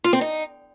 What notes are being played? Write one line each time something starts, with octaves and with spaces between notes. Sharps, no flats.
F4
C4
D#4